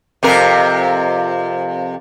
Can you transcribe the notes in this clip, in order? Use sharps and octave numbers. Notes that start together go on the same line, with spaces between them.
F2 C3 A#4